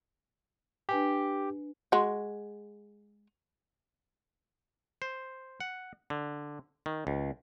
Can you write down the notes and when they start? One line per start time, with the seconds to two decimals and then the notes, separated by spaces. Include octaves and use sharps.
0.89 D4 G4 B4 G#5
1.92 G#3 F#4
5.02 C5
5.60 F#5
6.10 D3
6.86 D#3
7.07 C#2